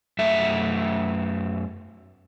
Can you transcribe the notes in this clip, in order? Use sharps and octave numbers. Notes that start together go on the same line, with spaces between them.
F#2 A3 E5